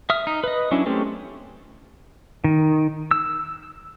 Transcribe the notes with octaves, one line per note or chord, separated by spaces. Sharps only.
E5 D#6 F6
D#4
B4 D#5
F#3 C#4 D4 E4
G#3 A3 C4 C#4 G4
D#3
E6